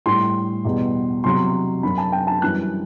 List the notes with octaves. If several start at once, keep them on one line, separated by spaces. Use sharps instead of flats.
A2 G3 C6
E2 B2 G3
E2 C3 F#3 C6
F#2 F#3 B5
A5
G5
A5
F#2 E3 G3 F#6